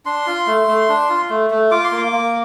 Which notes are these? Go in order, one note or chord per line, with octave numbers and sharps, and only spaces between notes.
D4 C6
F4
A3
A3
D4
F4
A3
A3
F4 D6
C6
A#3
D6
A#3